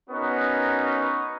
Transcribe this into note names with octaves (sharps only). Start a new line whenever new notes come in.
B3 C#4 D#4 F#4 A#4